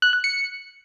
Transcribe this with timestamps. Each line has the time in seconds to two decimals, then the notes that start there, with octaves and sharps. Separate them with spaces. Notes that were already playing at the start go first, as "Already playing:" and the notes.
0.02 F#6
0.13 F#6
0.24 C#7